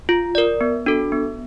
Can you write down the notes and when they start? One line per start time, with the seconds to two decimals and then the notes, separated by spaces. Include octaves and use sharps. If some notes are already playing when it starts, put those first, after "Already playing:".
0.09 F4
0.35 A#4 D5
0.61 B3
0.86 D4 F#4 A4
1.12 B3